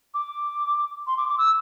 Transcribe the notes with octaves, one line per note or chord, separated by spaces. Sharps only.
D6
C6
D6
D6
E6